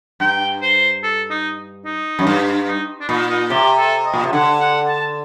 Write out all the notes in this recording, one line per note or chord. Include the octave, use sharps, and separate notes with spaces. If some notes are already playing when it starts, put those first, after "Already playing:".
G2 G5
C5
A4
D#4
D#4
F#2
G2
D#4
D4
A#2 D#4
D#4
C3 G4
A4
D#5
A#2
C3
D3 F#5
F#5
A5